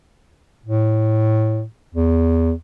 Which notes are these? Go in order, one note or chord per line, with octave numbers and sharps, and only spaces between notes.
A2
E2